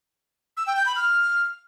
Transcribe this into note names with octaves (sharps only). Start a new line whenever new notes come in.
E6
G5
G6
B5
F6